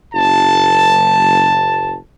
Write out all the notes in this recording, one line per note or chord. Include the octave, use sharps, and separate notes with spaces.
F#1 A5